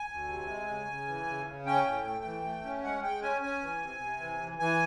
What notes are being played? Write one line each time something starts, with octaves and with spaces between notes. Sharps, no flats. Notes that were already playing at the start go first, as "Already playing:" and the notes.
Already playing: G#5
D2
C3
G#3
C#3
C#3
E3
C#3
C#3
C#4 G5
A2
A3
E3
A3
C#4
G#3 F#5
G#3 G5
C#4 G#5
C#4 G#5
E3
C3
C3
E3
E3
E3 G#5